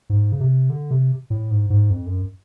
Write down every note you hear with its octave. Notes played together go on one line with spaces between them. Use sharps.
G#2
C#3
C3
D3
C3
A2
G#2
G#2
F2
F#2